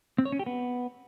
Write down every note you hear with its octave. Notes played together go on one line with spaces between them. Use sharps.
C4
C#5
C#4
G4
B3